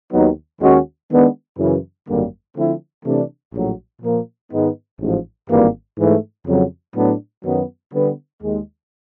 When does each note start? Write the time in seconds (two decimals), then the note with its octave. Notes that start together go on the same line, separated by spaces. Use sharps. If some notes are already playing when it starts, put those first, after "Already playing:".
0.12 D#2 D#3 F#3 B3 D#4
0.61 D#2 D#3 G#3 C#4 F#4
1.10 D#3 G#3 B3 D4
1.59 F#2 C#3 E3
2.08 G#1 F#2 D3 G3 A#3
2.56 D3 F3 A3 C4 E4
3.05 C3 E3 A3 D4
3.54 A#1 A2 F#3
4.02 A#2 F3 A#3
4.51 G#2 D#3 G#3 B3 D#4
5.00 A1 G#2 F3
5.49 G#1 G2 E3 G3 A#3
5.97 G#2 E3 A3
6.46 F2 C#3 F#3
6.95 A2 F#3 B3 D4
7.44 F#2 D#3 F#3 B3
7.93 D3 G3 B3
8.42 D#2 D#3 G#3